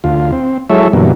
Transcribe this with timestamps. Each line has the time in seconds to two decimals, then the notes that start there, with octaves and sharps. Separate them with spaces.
0.04 D2 F4
0.32 C4
0.70 F#3 G#3 E4 A4 C#5 E5
0.93 G2 B2 D3 E3 F#3 A#3